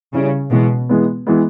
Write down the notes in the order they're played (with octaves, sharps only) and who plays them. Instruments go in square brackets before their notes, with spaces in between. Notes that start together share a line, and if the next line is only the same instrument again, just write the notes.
[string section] C#3 [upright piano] G3 C#4 E4
[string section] B2 [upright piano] E3 G#3 B3
[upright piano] E3 G#3 B3
E3 G#3 B3